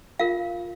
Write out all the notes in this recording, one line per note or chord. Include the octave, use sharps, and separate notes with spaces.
F4 A#4 F5